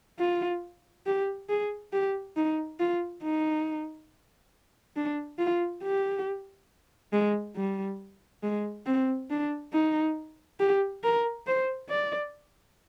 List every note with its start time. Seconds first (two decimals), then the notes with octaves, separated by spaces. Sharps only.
0.19 F4
1.06 G4
1.49 G#4
1.93 G4
2.36 D#4
2.80 F4
3.23 D#4
4.96 D4
5.39 F4
5.83 G4
7.12 G#3
7.56 G3
8.43 G#3
8.86 C4
9.30 D4
9.73 D#4
10.60 G4
11.04 A#4
11.47 C5
11.89 D5